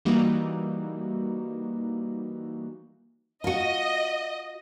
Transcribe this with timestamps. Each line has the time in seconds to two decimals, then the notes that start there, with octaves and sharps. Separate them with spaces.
0.05 E3 G3 A#3 D#4 F#4
3.44 F4 F#4 D#5